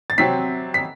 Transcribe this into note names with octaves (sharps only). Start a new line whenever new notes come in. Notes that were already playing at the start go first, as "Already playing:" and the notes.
A6
C3 F#3 C4 B6
B6